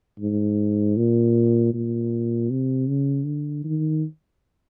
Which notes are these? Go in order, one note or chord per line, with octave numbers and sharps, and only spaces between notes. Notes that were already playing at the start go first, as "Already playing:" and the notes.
G#2
A#2
A#2
C3
C#3
D3
D#3